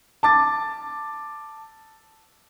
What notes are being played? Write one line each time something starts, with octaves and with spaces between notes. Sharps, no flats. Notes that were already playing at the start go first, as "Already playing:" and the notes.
A5 D6 A6